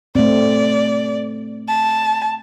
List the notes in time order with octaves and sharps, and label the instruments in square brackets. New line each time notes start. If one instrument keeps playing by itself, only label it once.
[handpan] A3 C4 [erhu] D5
[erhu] A5